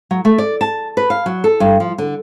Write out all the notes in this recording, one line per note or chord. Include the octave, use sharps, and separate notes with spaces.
F#3
A3
D5
A5
B4
F5
F#3
A4
G2
F3
D3